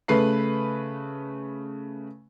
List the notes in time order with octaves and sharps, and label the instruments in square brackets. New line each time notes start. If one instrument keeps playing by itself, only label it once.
[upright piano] C#3 A3 B4 B5 C7